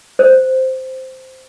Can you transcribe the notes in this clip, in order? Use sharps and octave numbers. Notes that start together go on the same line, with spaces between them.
C5